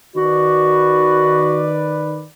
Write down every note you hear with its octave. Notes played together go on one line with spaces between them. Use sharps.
D#3 F#4 B4 D5